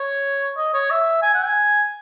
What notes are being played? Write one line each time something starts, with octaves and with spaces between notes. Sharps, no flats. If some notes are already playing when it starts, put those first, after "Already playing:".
Already playing: C#5
D#5
C#5
E5
G#5
F#5
G#5